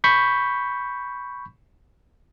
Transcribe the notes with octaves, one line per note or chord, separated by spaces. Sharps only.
B5 C#6 G6 B6